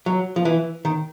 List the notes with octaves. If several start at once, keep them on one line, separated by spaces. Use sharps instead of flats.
F#3
F3
E3
D#3